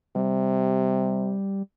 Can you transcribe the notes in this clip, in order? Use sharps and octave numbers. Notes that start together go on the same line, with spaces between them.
C3 G3